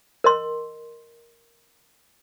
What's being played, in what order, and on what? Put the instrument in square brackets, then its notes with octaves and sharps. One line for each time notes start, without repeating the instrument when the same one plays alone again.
[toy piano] A#4 D#5 C6